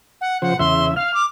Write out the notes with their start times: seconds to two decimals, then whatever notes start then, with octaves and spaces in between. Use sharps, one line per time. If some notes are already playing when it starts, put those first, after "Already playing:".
0.21 F#5
0.42 C#3 F3 C5 F#5
0.59 E2 C#3 E5 C6
0.96 F5 F6
1.14 D6